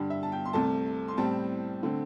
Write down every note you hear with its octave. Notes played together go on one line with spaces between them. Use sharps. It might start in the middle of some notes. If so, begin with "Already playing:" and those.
Already playing: G2 D3 G3
E5
A5
G5
C6
C2 C3 A3 A5
C6
A2 G3 C4 A5
D3 A3 C4